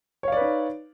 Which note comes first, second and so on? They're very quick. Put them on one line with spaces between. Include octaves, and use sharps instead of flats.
C#5 F5 D5 B4 D#4